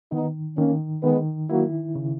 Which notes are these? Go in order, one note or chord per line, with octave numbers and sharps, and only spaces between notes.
D#3 B3 D#4
D#3 A#3 C#4
D#3 G#3 B3
F#3 A#3 E4
C#3